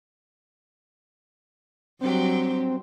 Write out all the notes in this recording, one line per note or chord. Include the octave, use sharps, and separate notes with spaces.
G2 F#3 C4 G4